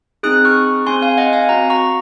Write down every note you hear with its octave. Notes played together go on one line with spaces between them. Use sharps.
C4 D#4 G#4 D#6 F#6
C#6 F6
C4 D#4 G#4 G#5 C6
F5 G#5
D#5 F#5
F5 G#5
C4 F#4 F#5 A#5
A#5 C#6